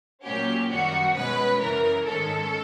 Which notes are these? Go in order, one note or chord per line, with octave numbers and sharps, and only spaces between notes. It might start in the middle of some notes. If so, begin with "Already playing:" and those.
A#2 F#3 A#3 C#4 G4
F#2 D#3 G3 F#4
B2 G#3 C#4 B4
F#2 C#3 E3 A#4
G#2 D#3 G#3 C#4 A4